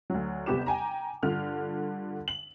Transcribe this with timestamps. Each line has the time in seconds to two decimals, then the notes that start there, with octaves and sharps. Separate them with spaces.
0.10 D2 F#3
0.46 G1 C3 B3 G4 D6 E7
0.66 G5 G#5 A#5
1.23 G2 D3 F4 F6
2.28 F#7